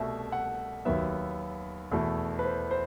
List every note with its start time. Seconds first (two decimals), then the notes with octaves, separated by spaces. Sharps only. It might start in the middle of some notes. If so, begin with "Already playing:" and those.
Already playing: C2 B2 A3 E5
0.32 F#5
0.85 D#2 D#3 F#3 B3 E5
1.91 E2 B2 A3 E4
2.39 B4
2.44 C5
2.71 C5